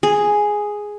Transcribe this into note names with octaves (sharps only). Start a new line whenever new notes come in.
G#4